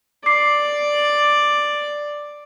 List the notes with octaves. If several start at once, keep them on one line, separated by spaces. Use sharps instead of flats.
D5 D6 C7